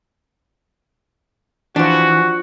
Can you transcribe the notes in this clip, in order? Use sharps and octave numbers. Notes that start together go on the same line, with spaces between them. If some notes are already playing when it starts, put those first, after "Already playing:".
E3 F3 D4 F#4